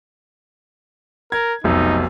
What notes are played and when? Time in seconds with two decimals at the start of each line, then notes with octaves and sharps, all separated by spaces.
1.32 A#4 G#6
1.64 F1 B1 D#4